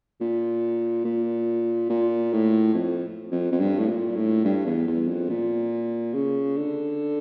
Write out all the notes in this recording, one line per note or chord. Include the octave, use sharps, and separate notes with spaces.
A#2
A#2
A#2
A2
F2
F2
F2
G2
A2
A#2
A2
G2
E2
E2
F2
A#2
C#3
D3